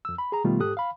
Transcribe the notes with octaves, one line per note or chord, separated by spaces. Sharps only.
F2 E6
B5
G#4 A#5
B2 D#3 G3 A3 B3 F4
G#2 G4 A4 D#6 F#6
F5 B5